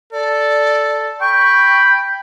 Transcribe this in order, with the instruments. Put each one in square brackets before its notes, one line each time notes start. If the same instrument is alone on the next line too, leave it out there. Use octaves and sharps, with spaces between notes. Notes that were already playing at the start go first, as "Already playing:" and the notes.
[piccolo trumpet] A4 [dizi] D5
[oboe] G5 [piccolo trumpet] B5 [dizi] C#6